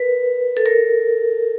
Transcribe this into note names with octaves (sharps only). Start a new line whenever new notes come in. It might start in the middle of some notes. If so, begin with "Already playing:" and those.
Already playing: A#4 B4
A4
A#4